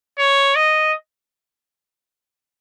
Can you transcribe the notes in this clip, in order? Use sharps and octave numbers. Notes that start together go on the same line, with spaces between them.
C#5
D#5